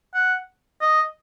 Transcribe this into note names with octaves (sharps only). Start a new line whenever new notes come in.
F#5
D#5